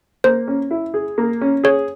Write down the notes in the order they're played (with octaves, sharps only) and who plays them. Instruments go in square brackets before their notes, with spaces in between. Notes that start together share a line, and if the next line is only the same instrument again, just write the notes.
[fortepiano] A#3 [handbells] C5
[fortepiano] C#4
E4
G#4
A#3
C#4
[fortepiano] G#4 [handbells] C#5